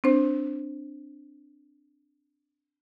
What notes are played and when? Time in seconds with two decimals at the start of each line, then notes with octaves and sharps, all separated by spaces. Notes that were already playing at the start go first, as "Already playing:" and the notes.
0.04 C4 D4 C5